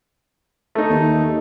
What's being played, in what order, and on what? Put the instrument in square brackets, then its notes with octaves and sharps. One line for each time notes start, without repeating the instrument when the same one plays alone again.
[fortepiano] A3 D#4
[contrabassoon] D#2